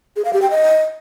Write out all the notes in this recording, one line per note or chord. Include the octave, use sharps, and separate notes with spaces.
G#4
F5
G4
G5
D#5